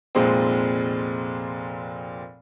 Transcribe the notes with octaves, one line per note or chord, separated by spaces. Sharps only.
F1 A#2 G#3 C4